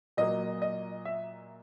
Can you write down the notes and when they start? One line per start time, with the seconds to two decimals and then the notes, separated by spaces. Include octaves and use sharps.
0.17 A#2 F#3 A#3 D#5
0.62 D#5
1.05 E5